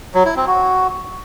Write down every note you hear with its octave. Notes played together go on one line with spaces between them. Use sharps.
F#3
E4
C4
F#4